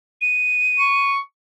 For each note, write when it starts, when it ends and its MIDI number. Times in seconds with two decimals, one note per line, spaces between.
0.21 1.11 99
0.79 1.19 85